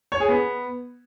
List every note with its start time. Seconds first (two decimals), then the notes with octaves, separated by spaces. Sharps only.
0.12 C#5
0.20 G#4
0.29 B3